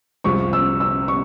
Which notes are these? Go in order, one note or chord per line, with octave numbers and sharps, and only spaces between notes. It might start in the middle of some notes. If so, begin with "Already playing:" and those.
C2 C3 F3 G#3 C4 C#6
E6
E6
C#6